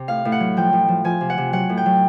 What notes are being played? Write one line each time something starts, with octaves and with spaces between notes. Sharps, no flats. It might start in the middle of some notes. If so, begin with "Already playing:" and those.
Already playing: C3
A2 F5
A2
F#5
F#3
F3 G5
A2
F3
F3 G#5
C3
F#5
C3
F#3 F#5
A2
G5
F#3